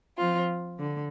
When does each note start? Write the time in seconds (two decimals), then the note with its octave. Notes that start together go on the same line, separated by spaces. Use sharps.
0.17 F3 C4 F4
0.78 D3